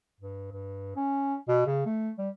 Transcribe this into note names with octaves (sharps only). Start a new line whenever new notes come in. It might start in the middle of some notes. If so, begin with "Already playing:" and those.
G2
G2
C#4
B2
C#3
A3
G3